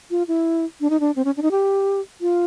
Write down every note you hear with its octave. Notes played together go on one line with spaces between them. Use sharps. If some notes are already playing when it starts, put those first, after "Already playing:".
F4
E4
D4
D#4
D4
C4
C#4
D4
D#4
G4
F4